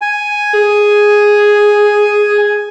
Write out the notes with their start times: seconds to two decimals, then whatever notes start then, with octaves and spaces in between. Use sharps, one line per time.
0.02 G#5
0.53 G#4